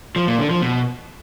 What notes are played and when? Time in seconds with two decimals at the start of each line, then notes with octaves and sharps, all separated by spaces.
0.16 F3
0.27 A#2
0.39 D3
0.50 F3
0.62 B2